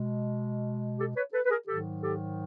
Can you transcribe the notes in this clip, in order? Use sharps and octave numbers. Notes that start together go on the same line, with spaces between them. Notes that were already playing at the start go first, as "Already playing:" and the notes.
Already playing: B2 G#3
G4 A4
B4 C#5
A4 B4
B4
G#4 A#4
G#2 D#3 F#3 G4 A4
G4 A4